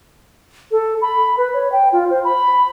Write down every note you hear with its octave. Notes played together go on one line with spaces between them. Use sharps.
A4
B5
B4
C#5
G5
F4
C5
B5